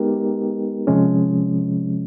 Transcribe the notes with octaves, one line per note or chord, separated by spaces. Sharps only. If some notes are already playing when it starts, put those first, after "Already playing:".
Already playing: G#3 B3 D#4 G4 A#4
C3 F3 G#3 C#4